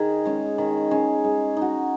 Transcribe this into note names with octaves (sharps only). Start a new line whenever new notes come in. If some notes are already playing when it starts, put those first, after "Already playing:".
Already playing: D#3 D#4 G#4
G#3 C#4
D#3
G#3 C#4
G#3
D#4 F#4